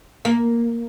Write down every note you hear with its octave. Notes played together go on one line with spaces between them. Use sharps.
A#3